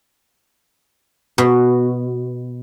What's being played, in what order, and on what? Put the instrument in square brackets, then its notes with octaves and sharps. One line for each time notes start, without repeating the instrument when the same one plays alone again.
[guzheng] B2